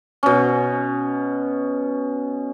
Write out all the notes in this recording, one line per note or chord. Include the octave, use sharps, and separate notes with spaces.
B2 C#4